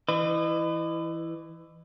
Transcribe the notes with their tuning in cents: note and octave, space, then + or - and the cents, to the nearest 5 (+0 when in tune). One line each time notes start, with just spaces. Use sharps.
E3 +0 B4 +30 D#5 -30